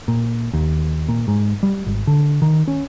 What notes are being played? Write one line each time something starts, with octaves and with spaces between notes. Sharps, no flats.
A#2
D#2
A#2
G#2
G3
G#1
D3
D#3
C#4